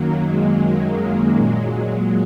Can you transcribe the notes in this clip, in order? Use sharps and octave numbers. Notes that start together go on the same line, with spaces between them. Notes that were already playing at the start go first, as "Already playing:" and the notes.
Already playing: F#2 D#3 F#3 A#3
G#3
A#2 F#3 G#3
G#3